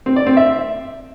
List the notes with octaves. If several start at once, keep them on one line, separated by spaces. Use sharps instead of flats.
C4
D5
C4
E5